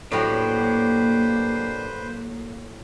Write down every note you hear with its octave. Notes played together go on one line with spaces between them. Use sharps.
A2 F#3 A#3 D4 G4 B4 C5